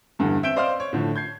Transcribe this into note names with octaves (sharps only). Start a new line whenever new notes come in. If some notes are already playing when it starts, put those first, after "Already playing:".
E2 G2 D3
C4 E5 G6 D7 E7 G7
C5 D5 D#5 F5 C6 F6
C#5
A2 D3 F3
G6 G#6 C7